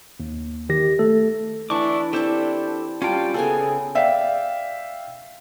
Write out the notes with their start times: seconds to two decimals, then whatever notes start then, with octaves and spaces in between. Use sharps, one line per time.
0.20 D#2
0.69 D#3 G4 A#6
0.99 A3 A4
1.70 E3 D4 E4 C#6 D6
2.13 C4 D4 E4 G4 A4 C5 E5
3.02 G3 C#4 F4 F5 G5 A5
3.34 C#3 B3 G#4 A4 G#5
3.95 D5 E5 F5 G5